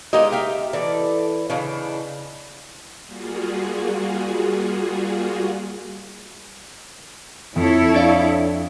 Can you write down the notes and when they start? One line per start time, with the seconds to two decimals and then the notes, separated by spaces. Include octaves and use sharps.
0.13 G#3 A#3 B3 D#4 G4 D#5
0.32 E5 F5 G5
0.73 E3 A4 D5
1.50 C#3 E3 D4 D#4
3.07 G3 A#3 F4 F#4 G#4
7.56 F2 E4 A4 C#5
7.94 D4 D5 F5